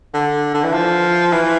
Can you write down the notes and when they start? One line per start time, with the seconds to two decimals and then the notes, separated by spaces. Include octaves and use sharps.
0.14 D3
0.54 D3
0.64 E3
0.73 F3
1.33 E3